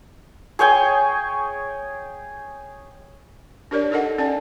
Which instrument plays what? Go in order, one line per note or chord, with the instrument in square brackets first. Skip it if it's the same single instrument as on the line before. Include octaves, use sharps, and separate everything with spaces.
[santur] G#4 C#5 G5 G#5
[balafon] D4 G4 A#4 C#5 D5
D#4 A4 A#4 D#5 F#5
C#4 D5 A5